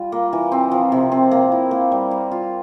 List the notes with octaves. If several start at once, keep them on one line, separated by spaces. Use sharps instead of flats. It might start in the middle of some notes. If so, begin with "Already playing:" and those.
Already playing: G3 F4
A#3
E3
C4
F3
C3
C4
A#3
E4
A#3
G3
F5
F4